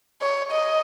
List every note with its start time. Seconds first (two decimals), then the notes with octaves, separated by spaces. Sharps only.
0.22 C#5
0.51 D#5